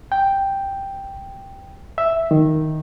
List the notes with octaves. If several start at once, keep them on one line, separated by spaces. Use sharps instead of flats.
G5
E5
D#3